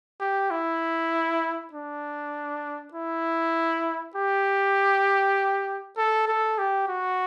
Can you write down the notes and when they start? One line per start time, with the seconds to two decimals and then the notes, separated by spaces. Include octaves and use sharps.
0.20 G4
0.51 E4
1.73 D4
2.93 E4
4.15 G4
5.97 A4
6.28 A4
6.58 G4
6.88 F#4